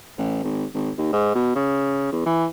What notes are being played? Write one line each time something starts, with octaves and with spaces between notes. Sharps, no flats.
A1
G#1
G#1
D#2
G#2
B2
C#3
E2
E3